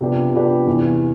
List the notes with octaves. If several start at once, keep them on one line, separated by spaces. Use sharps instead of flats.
C3 F3 B3 D4 G4
C3 F3 B3 D4 G4
E2 C3 E3